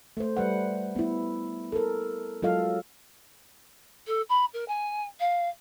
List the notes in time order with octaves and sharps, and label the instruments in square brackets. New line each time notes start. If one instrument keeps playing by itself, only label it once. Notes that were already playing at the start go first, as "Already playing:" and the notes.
[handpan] A3 C5
G3 B4 F#5
B3 E4
A4 A#4
F#3 G#3 F4 A4 D#5 F5
[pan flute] A4
B5
A#4
G#5
F5